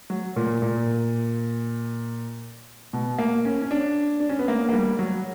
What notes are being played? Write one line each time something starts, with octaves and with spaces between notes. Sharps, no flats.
F#3
A#2
A#2
B2
A#3
C#4
C#4
D4
D4
C#4
B3
A#3
A#3
G3
F#3